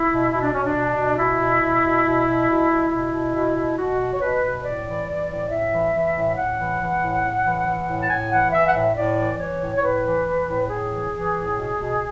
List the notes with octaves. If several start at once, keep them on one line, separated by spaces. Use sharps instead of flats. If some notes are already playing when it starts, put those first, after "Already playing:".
Already playing: E4
B2
B2 E4
D4
B2 C#4
D4
B2
B2
B2 E4
B2
B2
B2
B2
B2
B2
B2
B2 E4
B2
B2
B2
B2 F#4
B2
C#5
B2 B4
B2
A2 D5
E3
E3
A2
A2 E5
E3
E3
A2
A2 F#5
E3
E3
A2
A2
E3
E3
A2
A5
A2 G#5
E3 F#5
E3 E5
F#5
A2 E5
A2 D5
E3
E3 C#5
A2
C#5
A2 B4
E3
E3
A2
A2 G#4
E3
E3
A2
B2
B2